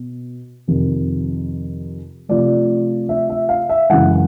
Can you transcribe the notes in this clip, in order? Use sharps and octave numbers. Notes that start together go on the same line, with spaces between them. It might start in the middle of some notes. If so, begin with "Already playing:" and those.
Already playing: B2
F2 C3 D#3
C3 F3 A3 D5
E5
E5
F5
E5
F#2 C#3 E3 G#3 F#5